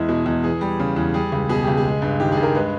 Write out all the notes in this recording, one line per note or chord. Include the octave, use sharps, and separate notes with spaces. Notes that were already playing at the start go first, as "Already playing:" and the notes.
Already playing: E2 G#3 E4
B2
E2
E3 G#4
G3
C#3
E2
G3 G#4
C#2
B2 G#4
C#2 G4
G#4
G#3
G2
D#3 G4
G2 G#4
A#4
G#3 B4